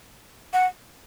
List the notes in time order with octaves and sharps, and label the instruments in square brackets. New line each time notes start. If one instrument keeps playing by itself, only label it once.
[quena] F#5